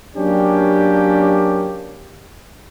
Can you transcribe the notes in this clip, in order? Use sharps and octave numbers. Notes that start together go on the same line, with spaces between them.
F#3 A#3 C#4 D4 G4